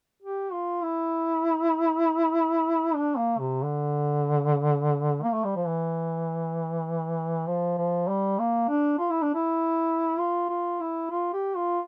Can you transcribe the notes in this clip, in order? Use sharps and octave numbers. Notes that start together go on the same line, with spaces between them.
G4
F4
E4
D4
A#3
C3
D3
A#3
A3
G3
F3
E3
F3
F3
G3
A#3
D4
F4
E4
D4
E4
F4
F4
E4
F4
G4
F4